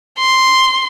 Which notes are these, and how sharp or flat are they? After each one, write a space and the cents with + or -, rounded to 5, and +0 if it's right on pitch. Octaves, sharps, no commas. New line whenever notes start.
C6 +0